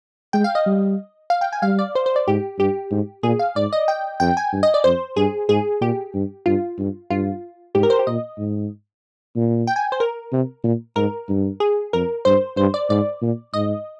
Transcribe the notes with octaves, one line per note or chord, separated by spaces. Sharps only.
G#3 G5
F5
D#5
G3
F5
G5
G#5
G3 F5
D5
C5
C5
D5
G#2 G4
G2 G4
G#2
A#2 G#4
F5
G#2 D5
D#5
G5
F2 G5
G#5
G2
D#5
D5
F2 C5
G2 G#4
G#2 G#4
A#2 G4
G2
G2 F4
G2
G2 F4
G#2 G4
A#4
C5
G4
A#2 D#5
G#2
A#2
G5
G#5
C5
A#4
C3
A#2
G#2 A#4
G2
G#4
F2 A#4
G2 C5
G2 C5
D5
G#2 D5
A#2
G#2 D#5